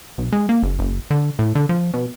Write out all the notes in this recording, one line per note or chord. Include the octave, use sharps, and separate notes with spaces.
B1
G#3
A#3
F#1
F#1
D3
A2
D3
F3
B2